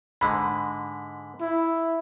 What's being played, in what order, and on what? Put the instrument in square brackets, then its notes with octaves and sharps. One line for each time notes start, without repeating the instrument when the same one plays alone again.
[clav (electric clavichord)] G#2 D3 G#3 [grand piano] B5
[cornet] E4